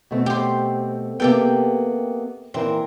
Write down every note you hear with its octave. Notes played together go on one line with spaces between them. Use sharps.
B2 A3 C4
G4 C5
C3 A#3 B3 G4 A4 G5
A#2 E3 C4 A#4